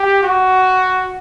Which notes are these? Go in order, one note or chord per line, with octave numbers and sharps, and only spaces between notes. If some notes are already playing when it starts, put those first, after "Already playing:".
Already playing: G4
F#4